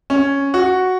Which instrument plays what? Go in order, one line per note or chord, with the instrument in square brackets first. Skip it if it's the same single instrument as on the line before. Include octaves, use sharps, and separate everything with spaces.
[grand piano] C#4
F#4